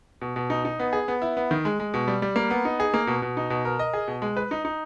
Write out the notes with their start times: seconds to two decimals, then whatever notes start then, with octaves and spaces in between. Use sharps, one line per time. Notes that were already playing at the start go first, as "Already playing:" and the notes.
0.21 B2
0.36 B2
0.50 D#4
0.65 D#4
0.79 B3
0.93 G#4
1.08 B3
1.22 E4
1.37 B3
1.51 D#3
1.65 G#3
1.80 G#3
1.94 B2
2.08 G3
2.22 G3
2.36 A#3
2.50 B3
2.65 D#4
2.80 G#4
2.94 A#3
3.07 B2
3.22 B2
3.37 D#4
3.50 B2
3.65 A#4
3.79 D#5
3.93 G#4
4.08 B2
4.22 G#3
4.37 B4
4.51 D#4
4.65 D#4